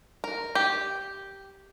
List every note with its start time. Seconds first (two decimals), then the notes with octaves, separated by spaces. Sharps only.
0.24 A#4
0.55 G4